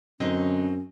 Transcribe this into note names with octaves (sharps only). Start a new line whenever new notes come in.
F#2 D3 F#3 C4 C#4 D#4 D#5